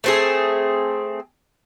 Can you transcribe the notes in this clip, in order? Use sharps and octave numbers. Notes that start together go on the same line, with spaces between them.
A3 C4 G#4